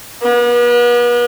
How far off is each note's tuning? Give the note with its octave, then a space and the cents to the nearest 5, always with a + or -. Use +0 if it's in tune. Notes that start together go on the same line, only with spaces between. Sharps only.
B3 -40